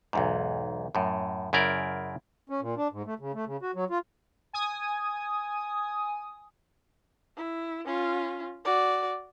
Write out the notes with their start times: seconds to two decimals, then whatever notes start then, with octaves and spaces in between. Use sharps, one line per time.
0.13 B1 E2 G#2
0.95 F#2 A2
1.53 F#2 C#3 E4 A#4 D5
2.50 C#4
2.61 A#2
2.77 D4
2.92 G#2
3.06 A3
3.19 C#3
3.34 A3
3.46 C#3
3.62 F#4
3.75 F#3
3.90 F4
4.53 G#5 D#6
7.37 E4
7.86 C#4 F4
8.65 F#4 D5